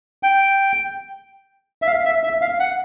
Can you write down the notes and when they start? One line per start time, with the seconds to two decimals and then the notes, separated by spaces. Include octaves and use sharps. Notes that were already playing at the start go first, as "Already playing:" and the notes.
0.23 G5
1.82 E5
1.87 F5
2.05 E5
2.24 E5
2.41 F5
2.60 F#5